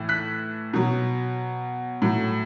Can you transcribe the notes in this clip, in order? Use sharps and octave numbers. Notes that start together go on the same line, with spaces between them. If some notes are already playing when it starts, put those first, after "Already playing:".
Already playing: A2 E3
F#6 B6
B2 F#3
A2 F#3